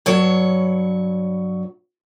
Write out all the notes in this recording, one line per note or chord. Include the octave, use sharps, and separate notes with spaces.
G2 F#3 C#5